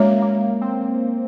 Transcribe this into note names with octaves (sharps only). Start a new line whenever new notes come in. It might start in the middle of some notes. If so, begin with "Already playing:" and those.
Already playing: G#3 A#3 C#4 F#4 C#5
A#3
C4